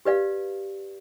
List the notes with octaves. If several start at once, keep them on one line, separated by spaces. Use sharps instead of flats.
G4 B4 D5 F5